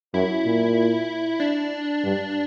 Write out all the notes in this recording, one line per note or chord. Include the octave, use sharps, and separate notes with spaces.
F#2 E4
A#2
D4
G2